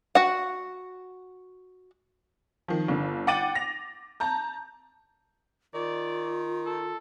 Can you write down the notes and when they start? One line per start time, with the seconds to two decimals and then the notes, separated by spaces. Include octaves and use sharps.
0.15 F#4 F#5
2.68 D#3 F3
2.88 G1 D3
3.27 F#5 G5 D6 A6 D#7 F#7
3.55 A#6 F7
4.20 A5 A#5 G6
5.74 D#3 F4 D5
6.66 A4